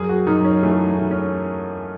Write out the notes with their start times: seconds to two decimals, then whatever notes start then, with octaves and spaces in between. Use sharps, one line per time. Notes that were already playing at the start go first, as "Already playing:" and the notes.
Already playing: F#2 G#4
0.09 F#4
0.27 F#2 D#4
0.45 C#4
0.63 E3 A3
0.98 E3
1.11 C#4